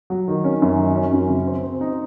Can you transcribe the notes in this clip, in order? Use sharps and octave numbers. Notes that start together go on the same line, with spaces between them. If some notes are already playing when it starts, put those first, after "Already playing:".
F#3
D#3
C#4
F#2
D#3
C#4
F#2
C#3
C4
C4
D#4